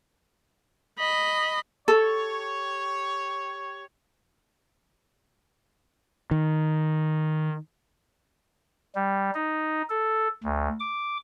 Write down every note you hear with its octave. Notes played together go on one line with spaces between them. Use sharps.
D#5 B5
G4 A4 C#5
D#3
G3
D#4
A4
D2
D6